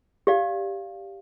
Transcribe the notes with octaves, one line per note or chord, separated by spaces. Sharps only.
G4 D5 F5